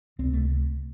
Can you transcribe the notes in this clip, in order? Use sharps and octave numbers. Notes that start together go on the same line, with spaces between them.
C#2 C3 C4
A3